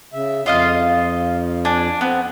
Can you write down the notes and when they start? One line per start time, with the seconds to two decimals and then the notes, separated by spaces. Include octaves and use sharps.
0.13 C#3 E5
0.46 F2 F4 D#5 F5
1.65 D4 G#5
2.01 B3 C4